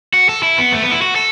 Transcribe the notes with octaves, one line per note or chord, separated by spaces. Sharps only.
F#4
A4
E4
B3
A3
B3
E4
F#4
A4